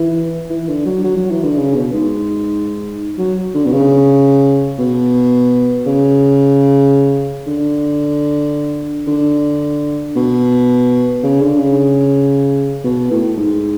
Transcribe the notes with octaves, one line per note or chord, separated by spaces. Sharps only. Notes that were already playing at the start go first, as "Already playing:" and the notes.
Already playing: E3
E3
D3
F#3
F#3
F#3
E3
D3
C#3
B2
G#2
F#3
D3
B2
C#3
B2
C#3
D3
D3
B2
C#3
D3
C#3
B2
A2
G#2